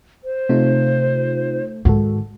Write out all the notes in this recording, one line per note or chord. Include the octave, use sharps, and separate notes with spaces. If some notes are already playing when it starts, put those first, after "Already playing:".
C5
C3 A3 D#4 F4
G#2 D#3 F#4 A4